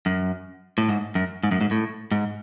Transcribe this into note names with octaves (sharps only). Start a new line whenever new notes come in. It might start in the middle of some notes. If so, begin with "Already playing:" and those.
F#2
A2
G#2
F#2
G#2
F#2
G#2
A2
G#2